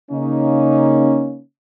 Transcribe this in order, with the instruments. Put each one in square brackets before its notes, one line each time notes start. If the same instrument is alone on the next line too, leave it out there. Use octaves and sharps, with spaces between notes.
[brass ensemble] C#3 A#3 C#4 D#4